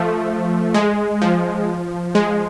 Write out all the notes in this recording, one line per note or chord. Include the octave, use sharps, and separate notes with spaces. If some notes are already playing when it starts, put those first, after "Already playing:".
Already playing: F3 A3
G#3
F3
G#3